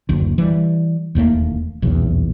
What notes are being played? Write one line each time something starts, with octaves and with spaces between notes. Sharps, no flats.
F#1 D2
E3 G3
E1 D#2 A3 A#3
D#1 B1 E2